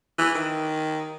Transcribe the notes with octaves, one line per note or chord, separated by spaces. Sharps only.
E3
D#3